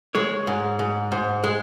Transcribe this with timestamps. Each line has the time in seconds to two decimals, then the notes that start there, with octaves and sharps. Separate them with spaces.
0.15 G#3 C#5
0.47 G#2
0.79 G#2
1.12 G#2
1.44 G#3